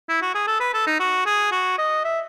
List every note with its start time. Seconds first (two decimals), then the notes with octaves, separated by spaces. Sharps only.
0.09 E4
0.22 F#4
0.34 G#4
0.47 A4
0.60 B4
0.74 A4
0.87 D#4
1.00 F#4
1.26 G#4
1.52 F#4
1.78 D#5
2.04 E5